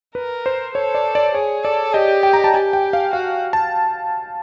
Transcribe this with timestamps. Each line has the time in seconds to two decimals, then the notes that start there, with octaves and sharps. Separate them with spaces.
0.15 A#4 B4
0.46 C5
0.75 A4 C#5
0.95 D5
1.15 D5
1.34 G#4 C#5
1.64 A4 D5
1.93 G4 D#5
2.23 G5
2.33 A#5
2.44 A5
2.54 G4 G#5
2.73 G5
2.93 F5
3.13 F#4 F5
3.53 A5